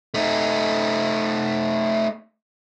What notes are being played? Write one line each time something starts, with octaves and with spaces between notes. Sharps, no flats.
A3 D#4